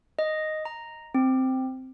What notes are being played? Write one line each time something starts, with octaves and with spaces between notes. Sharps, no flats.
D#5
A#5
C4